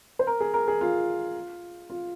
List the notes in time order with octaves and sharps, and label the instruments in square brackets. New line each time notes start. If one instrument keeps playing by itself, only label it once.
[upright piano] C5
A#4
G#4
A#4
G#4
F4
F4